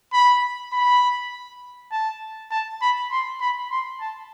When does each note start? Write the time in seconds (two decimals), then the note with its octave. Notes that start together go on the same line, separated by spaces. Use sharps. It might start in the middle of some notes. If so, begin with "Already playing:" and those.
0.13 B5
0.73 B5
1.92 A5
2.52 A5
2.82 B5
3.11 C6
3.41 B5
3.71 C6
4.01 A5